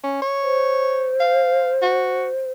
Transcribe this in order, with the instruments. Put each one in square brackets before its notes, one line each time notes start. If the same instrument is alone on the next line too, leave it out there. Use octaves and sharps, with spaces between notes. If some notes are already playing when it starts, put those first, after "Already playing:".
[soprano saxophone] C#4
C#5
[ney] C5
[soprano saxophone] F5
F#4